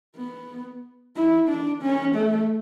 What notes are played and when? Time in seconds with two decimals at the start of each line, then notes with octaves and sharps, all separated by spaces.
0.16 B3
1.16 E4
1.49 D4
1.82 C#4
2.15 A3